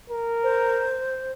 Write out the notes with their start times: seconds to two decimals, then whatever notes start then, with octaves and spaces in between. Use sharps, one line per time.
0.10 A#4
0.43 C5